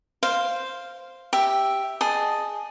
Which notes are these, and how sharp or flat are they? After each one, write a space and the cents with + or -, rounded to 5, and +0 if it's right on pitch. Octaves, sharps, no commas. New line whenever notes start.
C5 +0 F5 +0
G4 +0 E5 +0
G#4 +0 D#5 -25 A5 +0